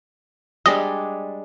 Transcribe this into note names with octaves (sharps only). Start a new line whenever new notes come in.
G3 G#3 D4 D#5